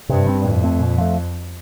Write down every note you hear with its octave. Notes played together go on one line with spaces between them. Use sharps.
G2 C3
G3 C4
F2 A2
A3 C4
A#2
F3 A3